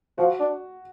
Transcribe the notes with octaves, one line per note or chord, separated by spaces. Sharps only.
F3 F#4
D4